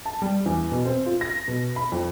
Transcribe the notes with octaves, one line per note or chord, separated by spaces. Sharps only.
A5
G3
E2
B2
C4
F4
A#6
B2
B5
F2